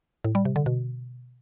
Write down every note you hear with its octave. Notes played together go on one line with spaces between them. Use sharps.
A2
G3
C3
D3
B2